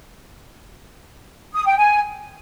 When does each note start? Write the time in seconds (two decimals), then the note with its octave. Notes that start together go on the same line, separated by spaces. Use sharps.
1.54 D#6
1.66 G5
1.78 G#5